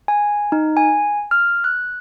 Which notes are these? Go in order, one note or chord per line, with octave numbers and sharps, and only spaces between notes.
G#5
D#4
G#5
F6
F#6